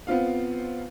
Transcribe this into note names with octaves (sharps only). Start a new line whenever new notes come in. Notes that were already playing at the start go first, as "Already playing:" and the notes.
B3 C4 F4 F5